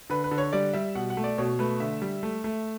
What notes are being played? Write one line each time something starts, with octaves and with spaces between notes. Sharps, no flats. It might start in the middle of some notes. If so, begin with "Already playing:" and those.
D3 B4
B4
D3
C#5
G3 D5
G3 E5
B2 F#5
F#5
A3
D5
B2 C#5
A3 B4
D3 E5
G3
A3
A3